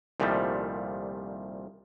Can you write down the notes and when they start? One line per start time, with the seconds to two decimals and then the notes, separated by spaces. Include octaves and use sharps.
0.20 C2 A#2 D#3 F3 G3 A3